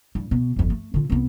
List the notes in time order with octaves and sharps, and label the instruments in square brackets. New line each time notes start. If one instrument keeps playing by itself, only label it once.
[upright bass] G2
B2
G1 F2
A3
D3 F4
C2 B3